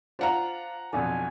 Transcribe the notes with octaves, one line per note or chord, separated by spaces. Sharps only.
D4 F4 C5 F#5 A#5
B1 F2 D3 G#5